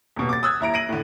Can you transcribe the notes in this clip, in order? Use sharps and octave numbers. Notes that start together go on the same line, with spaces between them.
D#1 B2
D6 A6
D#6 E6 F#6 G#6
D#1 E4 A#5 D7
A#6 D7 D#7 F#7
A2 D3